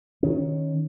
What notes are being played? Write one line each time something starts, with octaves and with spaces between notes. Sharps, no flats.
D#3 C#4